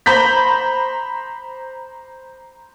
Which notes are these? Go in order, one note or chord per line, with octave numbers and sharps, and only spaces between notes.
C5 A#5 B5 G6 B6